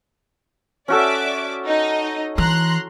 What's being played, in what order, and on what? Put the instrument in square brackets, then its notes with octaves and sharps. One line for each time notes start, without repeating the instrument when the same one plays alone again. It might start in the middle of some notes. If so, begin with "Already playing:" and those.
[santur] C#4 F#4 A4 [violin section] D5 E5 D6
[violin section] D#4 D#5
[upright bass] E3 [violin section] A#5 C6 F#6